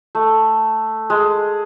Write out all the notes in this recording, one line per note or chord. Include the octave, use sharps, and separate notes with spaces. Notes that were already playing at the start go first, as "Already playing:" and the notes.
A3
G#3